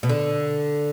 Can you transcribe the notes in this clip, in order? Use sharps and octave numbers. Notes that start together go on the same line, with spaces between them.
B2
D3